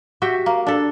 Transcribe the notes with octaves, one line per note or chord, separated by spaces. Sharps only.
F#4 G4 E5 G5
A#3
D4 A4